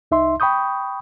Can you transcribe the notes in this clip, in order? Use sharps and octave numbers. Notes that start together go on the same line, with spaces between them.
C2 D#4 E5 C6
G5 B5 C#6 D#6 G6